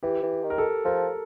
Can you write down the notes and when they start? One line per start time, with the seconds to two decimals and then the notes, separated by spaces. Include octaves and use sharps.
0.03 E3 G4
0.23 E3
0.44 D#3
0.50 A#4
0.58 A4
0.85 F3 A#4